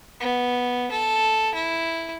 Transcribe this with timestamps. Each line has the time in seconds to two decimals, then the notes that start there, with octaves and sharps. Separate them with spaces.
0.20 B3
0.91 A4
1.55 E4